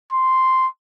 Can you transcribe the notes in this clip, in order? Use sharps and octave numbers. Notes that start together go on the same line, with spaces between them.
C6